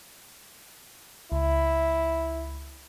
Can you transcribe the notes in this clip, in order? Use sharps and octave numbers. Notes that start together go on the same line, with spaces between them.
C#2 E4